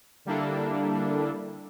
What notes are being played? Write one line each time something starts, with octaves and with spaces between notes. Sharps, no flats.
D3 G3 A#3 D4 E4 A4